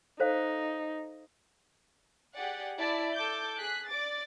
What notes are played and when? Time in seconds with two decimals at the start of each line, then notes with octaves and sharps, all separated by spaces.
0.20 D#4 A4 C5 F5
2.34 G4 G#4 D5 F#5
2.79 E4 D5 A5
3.14 A4 D6 G6
3.59 G#4 F#6 B6
3.88 D5 D6 A6